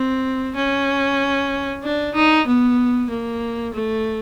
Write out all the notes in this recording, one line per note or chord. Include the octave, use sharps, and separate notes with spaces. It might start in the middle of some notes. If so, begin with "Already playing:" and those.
Already playing: C4
C#4
D4
D#4
B3
A#3
A3